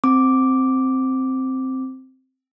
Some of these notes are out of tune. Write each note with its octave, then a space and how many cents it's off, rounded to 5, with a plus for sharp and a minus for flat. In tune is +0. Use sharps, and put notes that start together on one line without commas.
C4 +0 D6 +0